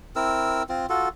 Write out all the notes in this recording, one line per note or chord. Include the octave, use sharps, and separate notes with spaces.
C4 E4 A#4 E6
C4 F4
F4 F#4 A4